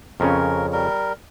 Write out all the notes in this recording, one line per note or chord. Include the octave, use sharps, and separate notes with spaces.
F2 C#3 C#4 A#4
G3 A#4